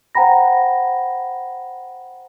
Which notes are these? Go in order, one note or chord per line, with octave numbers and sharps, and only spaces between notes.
C5 F#5 G5 A#5 B5 A#6